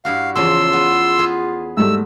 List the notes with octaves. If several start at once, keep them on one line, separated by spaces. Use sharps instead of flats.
G2 E4 F#4 F5
E2 C#3 F3 F4 C6 E6
B3
B3 G#4
G#2 G3 A3 E6